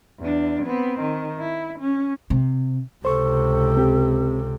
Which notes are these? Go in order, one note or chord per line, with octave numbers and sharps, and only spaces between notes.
E2 D4
B3 C4
D#3
E4
C#4
C3
C#2 C3 A4 C5 C#6
C4 G4